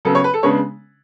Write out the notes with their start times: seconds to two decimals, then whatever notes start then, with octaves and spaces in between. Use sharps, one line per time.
0.05 C#3 F#3 B3 A4
0.15 C#5
0.24 B4
0.34 A4
0.43 C#3 G#3 B3 D4 C#5